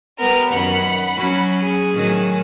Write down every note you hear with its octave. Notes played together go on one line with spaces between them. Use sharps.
G3 B3 A#4
F#2 D#3 F#5 B5
F#3 C#4
G#4
A2 D#3 F#3